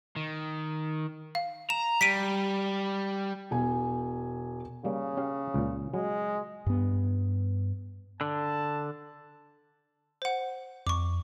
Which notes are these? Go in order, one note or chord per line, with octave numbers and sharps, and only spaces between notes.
D#3
F5
A#5 E7
G3 B6 D7 D#7
E1 G#5
C#3 G3 A#3
C#4 G4 F5
C#2 A#2
F#3 G#3
G2 B3
D3 A5
C5 F#5
F2 C#6 D6